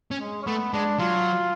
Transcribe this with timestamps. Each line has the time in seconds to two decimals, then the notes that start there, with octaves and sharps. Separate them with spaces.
0.11 C#4
0.20 G#3
0.43 C#4
0.46 A3 B3
0.73 G#3 D4
0.99 F#3 F4